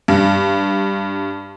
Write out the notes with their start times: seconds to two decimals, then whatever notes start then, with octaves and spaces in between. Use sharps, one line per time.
0.08 G2